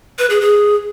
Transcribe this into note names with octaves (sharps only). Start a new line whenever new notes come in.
B4
G#4
G#4